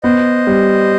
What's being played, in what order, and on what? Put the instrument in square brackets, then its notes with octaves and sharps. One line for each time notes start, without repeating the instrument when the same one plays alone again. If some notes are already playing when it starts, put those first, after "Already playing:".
[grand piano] B3 [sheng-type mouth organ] C5 D#5
[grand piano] G3